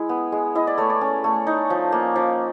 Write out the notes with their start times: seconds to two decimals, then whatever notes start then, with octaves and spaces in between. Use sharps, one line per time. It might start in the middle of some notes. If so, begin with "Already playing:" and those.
Already playing: G#3 E4
0.09 B3
0.32 G#3
0.55 E4 D#5
0.67 D5
0.78 A3 C#5
0.90 D5
1.01 C#4
1.24 A3
1.47 D#4
1.70 F3
1.92 A#3
2.16 F3